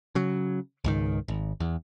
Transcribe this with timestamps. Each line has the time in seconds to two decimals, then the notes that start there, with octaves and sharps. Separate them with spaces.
0.15 C#3 F#3
0.84 C#2 G#2 D#3
1.28 G#1
1.60 E2